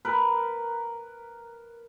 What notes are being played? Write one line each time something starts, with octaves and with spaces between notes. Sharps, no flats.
A#4 B4